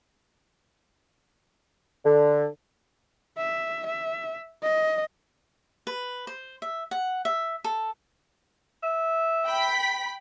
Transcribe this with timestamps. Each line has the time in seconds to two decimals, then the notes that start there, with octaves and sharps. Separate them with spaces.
2.04 D3
3.37 E5
3.86 E5
4.63 D#5
5.87 B4
6.27 C5
6.62 E5
6.91 F#5
7.25 E5
7.64 A4
8.83 E5
9.45 G5 B5 B6